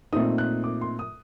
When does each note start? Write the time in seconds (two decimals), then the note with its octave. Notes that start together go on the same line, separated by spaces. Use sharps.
0.13 A#2 A3 C4 D#4 D#6
0.38 F#6
0.64 D6
0.81 C6
0.99 D#6